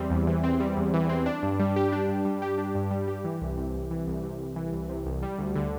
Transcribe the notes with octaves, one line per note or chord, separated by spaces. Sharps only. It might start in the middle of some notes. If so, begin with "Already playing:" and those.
Already playing: E2 E3 G3 C4
E2
E3
C4
G3
E2
E3
C4
D4
G2
G3
G4
D4
G2
G3
G4
D4
G2
G3
G4
E3
C2
C3
C2
E3
C2
C3
C2
E3
C2
C3
C2
G3
D2
D3